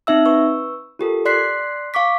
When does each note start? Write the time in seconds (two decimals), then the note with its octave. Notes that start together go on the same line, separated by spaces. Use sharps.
0.07 C4 D#4 E5 E6
0.25 B4 C#6 E6
0.99 F4 G4 A4 A#4
1.25 D5 C6 F#6 B6 C7
1.94 F5 C#6 D6 B6